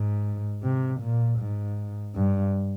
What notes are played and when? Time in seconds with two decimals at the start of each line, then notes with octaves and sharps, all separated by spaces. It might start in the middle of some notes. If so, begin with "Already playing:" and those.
Already playing: G#2
0.63 C3
1.01 A#2
1.39 G#2
2.15 G2